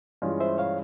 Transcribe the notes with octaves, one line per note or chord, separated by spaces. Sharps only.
G2 E3 G#3 C#4 F4
C5 E5
C#5 F5